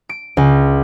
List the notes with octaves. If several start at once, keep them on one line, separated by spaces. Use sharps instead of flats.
D7
C#2